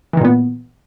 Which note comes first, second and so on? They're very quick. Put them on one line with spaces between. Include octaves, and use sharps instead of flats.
E3 D#3 A#2 B3